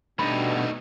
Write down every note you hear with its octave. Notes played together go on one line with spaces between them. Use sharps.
G2 B2 A3 D#4 B5